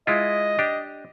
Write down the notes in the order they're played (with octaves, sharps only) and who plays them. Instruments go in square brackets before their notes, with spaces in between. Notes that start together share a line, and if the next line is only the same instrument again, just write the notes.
[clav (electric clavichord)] G#3 E4 F4 [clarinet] D#5
[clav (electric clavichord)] D4 G4